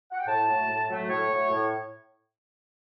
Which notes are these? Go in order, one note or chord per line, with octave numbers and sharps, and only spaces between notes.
F#5
G5
A2 A5
F#3 A3
A2
F#3 A3
A2 C#5
F#3 A3
A2